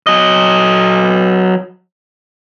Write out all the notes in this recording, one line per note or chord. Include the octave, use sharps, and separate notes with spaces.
F#3 D#5